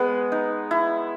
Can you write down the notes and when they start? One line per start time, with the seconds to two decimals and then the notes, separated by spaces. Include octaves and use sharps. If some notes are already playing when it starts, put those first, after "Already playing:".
Already playing: G#3 B3
0.32 D#4
0.71 E4